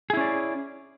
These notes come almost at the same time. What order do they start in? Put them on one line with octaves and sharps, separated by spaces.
G#4 E4 C#4 D5